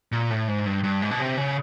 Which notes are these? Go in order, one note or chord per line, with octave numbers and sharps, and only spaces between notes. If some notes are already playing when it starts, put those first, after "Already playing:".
A#2
A2
G#2
G2
G2
G#2
B2
C3
C#3